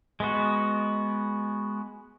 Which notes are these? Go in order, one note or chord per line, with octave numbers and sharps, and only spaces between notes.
G#3 B3 F#4